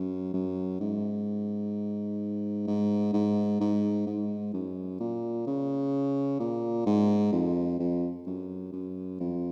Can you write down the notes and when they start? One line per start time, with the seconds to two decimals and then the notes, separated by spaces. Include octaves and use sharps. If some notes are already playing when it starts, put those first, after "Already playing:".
Already playing: F#2
0.34 F#2
0.80 G#2
2.67 G#2
3.13 G#2
3.61 G#2
4.07 G#2
4.54 F#2
5.00 A#2
5.47 C#3
6.40 A#2
6.87 G#2
7.33 F2
7.80 F2
8.26 F#2
8.73 F#2
9.20 F2